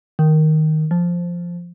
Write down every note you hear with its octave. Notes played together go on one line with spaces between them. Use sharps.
D#3
F3